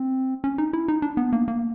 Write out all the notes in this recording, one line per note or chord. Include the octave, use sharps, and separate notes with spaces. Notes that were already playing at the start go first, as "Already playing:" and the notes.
Already playing: C4
C#4
D#4
E4
D#4
D4
B3
A#3
A#3